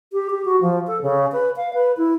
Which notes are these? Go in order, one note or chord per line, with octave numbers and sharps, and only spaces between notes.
G4
G4
F#4
F3
A4
C#3
B4
F5
B4
E4